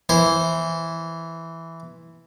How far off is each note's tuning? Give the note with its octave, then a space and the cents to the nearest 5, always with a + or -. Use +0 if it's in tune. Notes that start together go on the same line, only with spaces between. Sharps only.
E3 +0 C5 +0